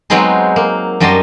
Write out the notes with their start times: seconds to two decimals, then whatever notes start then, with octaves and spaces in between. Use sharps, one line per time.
0.10 F#3 G#3 B3 C4 D#4 G#4
0.56 A#3
1.00 F#2 F#3 G3 D#5 A5 C6